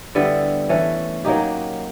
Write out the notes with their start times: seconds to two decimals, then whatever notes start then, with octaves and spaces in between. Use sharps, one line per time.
0.15 D3 G3 B3 E4
0.69 E3 A3 C#4
1.25 F#3 A#3 D#4 G4